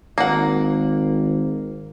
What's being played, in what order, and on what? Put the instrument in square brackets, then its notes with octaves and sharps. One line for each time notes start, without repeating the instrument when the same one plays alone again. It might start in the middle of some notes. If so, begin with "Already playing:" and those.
[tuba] G#1 [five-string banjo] A#3 F#5